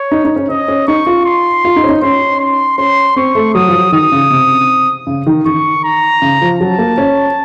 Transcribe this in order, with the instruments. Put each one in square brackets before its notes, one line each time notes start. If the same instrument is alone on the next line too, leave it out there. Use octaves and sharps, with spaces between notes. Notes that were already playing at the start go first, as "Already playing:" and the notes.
Already playing: [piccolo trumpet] C#5
[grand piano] D#4
D#4
C#4
[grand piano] C#4 [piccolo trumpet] D#5
[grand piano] C#4
[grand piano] D#4 [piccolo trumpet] C#6
[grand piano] F4
[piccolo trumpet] C6
[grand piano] F4
D#4
C#4
D#4
[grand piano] C#4 [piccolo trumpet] C6
[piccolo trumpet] C6
[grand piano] C#4 [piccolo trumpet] C6
[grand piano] C4 [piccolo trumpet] C#6
[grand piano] A3
[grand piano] F#3 [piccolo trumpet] D#6
[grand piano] F3
F#3
[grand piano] D#3 [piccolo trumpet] D#6
[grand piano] C#3
C3
C#3
D#3
[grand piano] D#3 [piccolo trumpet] C#6
[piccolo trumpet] A#5
[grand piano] C#3
F3
[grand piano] F#3 [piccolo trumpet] A5
[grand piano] A#3
C#4